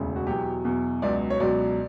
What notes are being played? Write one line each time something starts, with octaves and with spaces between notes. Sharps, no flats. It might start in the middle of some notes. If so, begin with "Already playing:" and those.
Already playing: E1 D2 C#3
F#4
E2 B2 F#3 G4
E2 B2 F#3
C#2 B2 F#3 D5
C#5
C#2 B2 F#3 D5